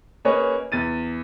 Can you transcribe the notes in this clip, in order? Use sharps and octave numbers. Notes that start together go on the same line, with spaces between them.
A#3 C#4 G#4 B4 C#5 D#5
E2 A6 D#7